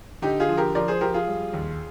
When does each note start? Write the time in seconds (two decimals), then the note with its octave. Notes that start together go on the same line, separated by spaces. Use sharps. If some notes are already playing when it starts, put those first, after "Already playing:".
0.22 D3 D#4 G4
0.40 F4 G#4
0.49 F3
0.57 G4 A#4
0.75 F3 A#4 D5
0.88 G#4 C5
1.01 F3 G4 A#4
1.14 F4 G#4
1.27 G3
1.53 D#2